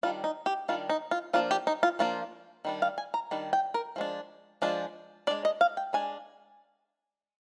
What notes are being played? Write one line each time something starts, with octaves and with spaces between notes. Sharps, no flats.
D#3 G3 D4 F4
D#4
G4
D#3 G3 D4 F4
D#4
F4
F3 A#3 D4 F4
G4
D#4
F4
F3 A#3 D4 F4
D#3 G3 D4
F5
G#5
A#5
D#3 G3 D4
G5
A#4
F3 G#3 D4
F3 G#3 D4
G#3 D4 D5
D#5
F5
G5
G#3 D4 G#5